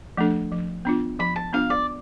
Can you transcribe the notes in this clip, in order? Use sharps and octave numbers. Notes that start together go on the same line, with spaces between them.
F3 A3 D4 A4
F3
B3 D4 F4
F3 B5
A5
B3 D4 F4 F5
D5